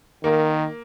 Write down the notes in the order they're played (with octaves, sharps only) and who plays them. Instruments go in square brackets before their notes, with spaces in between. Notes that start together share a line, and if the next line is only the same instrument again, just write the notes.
[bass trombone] D#3 [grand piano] A#3